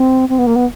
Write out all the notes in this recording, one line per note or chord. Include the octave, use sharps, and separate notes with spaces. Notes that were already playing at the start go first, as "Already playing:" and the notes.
Already playing: C4
C4
B3
A#3
B3